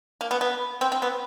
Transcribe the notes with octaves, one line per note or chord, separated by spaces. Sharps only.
A#3
B3
B3
C4
C4
B3